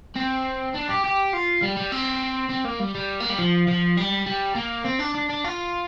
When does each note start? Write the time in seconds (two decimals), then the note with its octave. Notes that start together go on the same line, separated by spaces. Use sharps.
0.15 C4
0.74 D4
0.89 G4
1.04 G4
1.33 F4
1.62 G3
1.77 G3
1.92 C4
2.50 C4
2.65 A#3
2.80 G3
2.95 G3
3.20 A#3
3.29 G3
3.39 F3
3.68 F3
3.97 G3
4.26 G3
4.56 A#3
4.85 C4
5.00 D4
5.15 D4
5.30 D4
5.44 F4